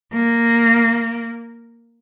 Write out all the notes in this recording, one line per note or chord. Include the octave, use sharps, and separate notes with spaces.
A#3